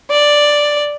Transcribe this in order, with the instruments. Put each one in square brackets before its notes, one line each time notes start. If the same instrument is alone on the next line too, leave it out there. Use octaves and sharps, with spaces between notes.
[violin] D5